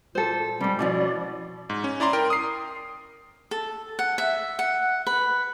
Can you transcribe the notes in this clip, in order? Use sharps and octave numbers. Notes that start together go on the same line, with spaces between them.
A#2 A4 C5
G#2 C3 G3
B2 F3 C#4 E4 D5
G#2
C#4
E4 D5 A#5 C6
A#4 G5
D#6 C7
A4
F#5
E5
F#5
B4